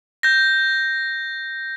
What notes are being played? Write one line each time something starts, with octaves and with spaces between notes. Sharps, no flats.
G6 A#6